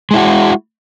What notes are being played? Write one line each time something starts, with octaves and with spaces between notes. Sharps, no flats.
G#3 E4 F#4